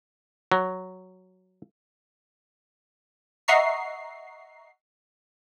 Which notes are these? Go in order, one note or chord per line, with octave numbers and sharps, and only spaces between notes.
F#3
D#5 E5 F#5 A#5 C#6 C7